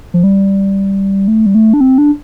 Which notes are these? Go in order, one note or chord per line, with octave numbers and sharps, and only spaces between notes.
F3
G3
A3
G3
A3
D4
C4
D4